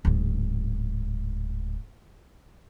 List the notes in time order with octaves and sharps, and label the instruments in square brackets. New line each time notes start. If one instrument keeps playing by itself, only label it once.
[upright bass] D1 G#2